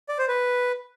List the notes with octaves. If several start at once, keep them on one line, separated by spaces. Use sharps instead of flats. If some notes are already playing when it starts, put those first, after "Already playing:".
D5
C5
B4